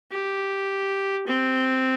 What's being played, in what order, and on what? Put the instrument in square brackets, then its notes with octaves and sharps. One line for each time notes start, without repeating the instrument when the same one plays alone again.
[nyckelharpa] G4
C4